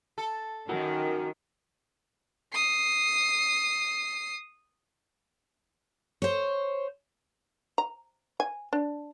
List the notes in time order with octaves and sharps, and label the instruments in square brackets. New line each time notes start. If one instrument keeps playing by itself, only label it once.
[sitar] A4
[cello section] D#3 [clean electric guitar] F#4 A#4
[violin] D#6 C7
[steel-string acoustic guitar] C5 C#5
[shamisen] A#5
G#5
D4